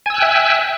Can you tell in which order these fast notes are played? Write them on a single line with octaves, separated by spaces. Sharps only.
G#5 E6 F#6 G5 E5